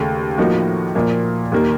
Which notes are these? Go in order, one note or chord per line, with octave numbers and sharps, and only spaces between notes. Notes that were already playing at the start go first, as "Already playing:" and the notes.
Already playing: D#2 C#3 A3
A2 F3 A#3 D#4 F#4
A#2 F3 A#3
D#2 D#3 A#3